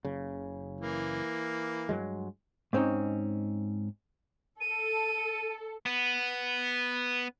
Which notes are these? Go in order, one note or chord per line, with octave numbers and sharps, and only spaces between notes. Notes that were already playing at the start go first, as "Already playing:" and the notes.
F#1 C#3
E3 A#3
G2 F#3 G#3
G#2 C4 C#4 D#4
A4 D#7
B3